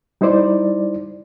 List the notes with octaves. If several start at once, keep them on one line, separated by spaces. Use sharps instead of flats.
G3 D#4 E4 C5 D5